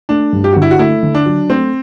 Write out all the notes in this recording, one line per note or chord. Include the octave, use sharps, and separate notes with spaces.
A3 D4
G2
G4
D3 F#4
E4
F#4
A3 E4
D3
D4
F#3
A3 C4